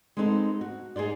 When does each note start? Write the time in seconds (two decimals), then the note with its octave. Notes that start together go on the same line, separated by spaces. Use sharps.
0.17 G#3 B3 C4 D#4 G#4 A4
0.61 F#4
0.96 D#4 G#4 A4 C5 D5